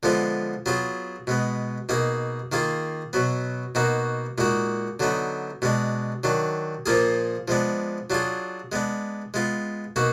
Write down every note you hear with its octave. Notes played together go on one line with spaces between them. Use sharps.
D3 F3 G#3 B3 F4
F#3 B3 F4 G#4
B2 G#3 B3
B2 A#3 D#4 G#4
D#3 A#3 F4 G#4
B2 F#3 B3
B2 A#3 D#4 F#4
A#2 G#3 D#4 F#4
D3 F#3 B3 D#4
B2 G#3 D4
D#3 F#3 D4
A#2 F3 A#3 F4 G#4
F3 G#3 B3 D4
F#3 D4 F4 G#4
G#3 B3 D4
G#3 B3 F4
B2 A#3 D#4 F#4